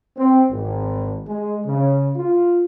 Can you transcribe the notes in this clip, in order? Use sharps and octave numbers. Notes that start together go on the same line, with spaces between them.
C4
G#1
G#3
C#3
F4